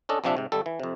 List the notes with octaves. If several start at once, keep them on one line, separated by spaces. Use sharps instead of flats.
C#4 D4 A4 D#5
A#1 C3 F3 D4 E5
G#2 C3
G#1 G3 A4
E3
F2 C3